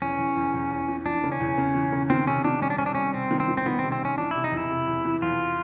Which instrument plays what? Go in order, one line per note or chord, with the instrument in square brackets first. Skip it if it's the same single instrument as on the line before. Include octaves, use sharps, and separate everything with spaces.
[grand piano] E2 [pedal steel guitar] C#4
[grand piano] E2
E2
E2
E2
E3
[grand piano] E3 [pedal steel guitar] D4
[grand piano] C#3
[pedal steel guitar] C#4
[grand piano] E2
C#3
E3
C#3
[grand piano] D#3 [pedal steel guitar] C4
[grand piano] C3 [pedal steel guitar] C#4
[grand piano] D#3 [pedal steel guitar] D4
[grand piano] G3 [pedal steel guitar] C#4
[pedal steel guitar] D4
[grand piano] C4 [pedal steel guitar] C#4
[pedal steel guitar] D4
[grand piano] G3 [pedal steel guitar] C#4
[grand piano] C3 [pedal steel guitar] C4
[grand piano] D#3
[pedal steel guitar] C4
[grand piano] D#3
[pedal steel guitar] C4
[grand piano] D#3 [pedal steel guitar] B3
[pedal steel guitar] C4
[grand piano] C3
[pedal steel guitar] C4
[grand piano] C3 [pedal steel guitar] C#4
[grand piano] E3 [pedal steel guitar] D4
[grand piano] C3 [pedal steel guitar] E4
[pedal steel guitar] D#4
[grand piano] E2
[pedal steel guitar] E4
[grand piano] C3
E2
E3
[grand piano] E2 [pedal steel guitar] F4